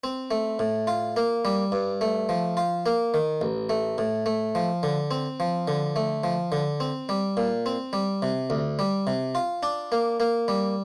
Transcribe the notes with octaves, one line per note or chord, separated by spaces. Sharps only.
C4
A3
A2
F4
A#3
G3
G2
A3
F3
F4
A#3
D#3
A1
A3
A2
A3
F3
D3
C4
F3
D3
A3
F3
D3
C4
G3
A#2
C4
G3
C3
D2
G3
C3
F4
D4
A#3
A#3
G3